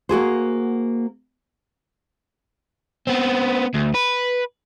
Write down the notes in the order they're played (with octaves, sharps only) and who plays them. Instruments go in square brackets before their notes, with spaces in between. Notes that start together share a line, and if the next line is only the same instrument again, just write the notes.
[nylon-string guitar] A#3 F#4 G#4 C5
[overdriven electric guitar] B3 C4
D2
B4